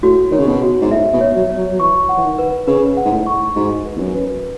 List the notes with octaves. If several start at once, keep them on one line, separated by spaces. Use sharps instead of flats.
A2 F#4
D#3 C#5
C#3
B2
F#4
G#2
A2 E5
B2
C#5
F#3
C#5
F#3
F#3
E3 C#6
F#5
E3
D#3
B4
C#3 B4
F#5
G#2
A2
C#6
G#2 F#4
B4
E2
F#2
B4